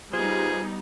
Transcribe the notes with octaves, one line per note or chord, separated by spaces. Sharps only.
G3 B3 D#4 F4 G#4 C5